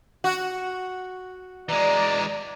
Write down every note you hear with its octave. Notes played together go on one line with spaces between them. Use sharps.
F#4
E3 G#3 D5 A#5